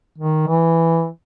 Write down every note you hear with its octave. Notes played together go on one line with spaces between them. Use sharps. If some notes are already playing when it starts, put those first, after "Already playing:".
D#3
E3